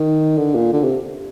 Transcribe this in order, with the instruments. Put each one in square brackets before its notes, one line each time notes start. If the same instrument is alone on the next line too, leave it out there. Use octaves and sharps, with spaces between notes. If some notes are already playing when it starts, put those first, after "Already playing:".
Already playing: [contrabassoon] D#3
D3
A#2
D3
C3